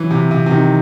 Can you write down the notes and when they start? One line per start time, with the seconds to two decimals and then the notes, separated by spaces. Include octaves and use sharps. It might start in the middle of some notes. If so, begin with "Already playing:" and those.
Already playing: E3 F#3
0.10 C3
0.31 C3
0.46 C3
0.51 D#3